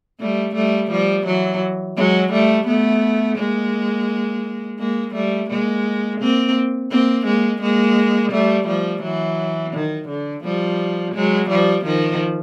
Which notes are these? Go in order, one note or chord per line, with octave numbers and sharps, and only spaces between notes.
G3 A3
G3 A3
F3 G3
E3 F#3
F#3 G#3
G3 A3
A3 B3
G#3 A#3
G#3 A#3
G3 A3
G#3 A#3
A#3 C4
A#3 C4
G#3 A#3
G#3 A#3
G3 A3
F3 G3
E3 F#3
D#3
D3
F3 G3
F#3 G#3
F3 G3
D#3 F3